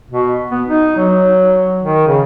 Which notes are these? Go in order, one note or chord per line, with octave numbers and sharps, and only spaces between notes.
B2
B3
D#4
F#3
D#3
C#3